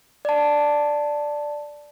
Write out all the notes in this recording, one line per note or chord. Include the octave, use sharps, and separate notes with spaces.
D5 A5